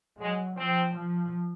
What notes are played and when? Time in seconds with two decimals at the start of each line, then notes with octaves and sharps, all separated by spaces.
0.18 F#3 G#3
0.56 F3 C4
0.94 F3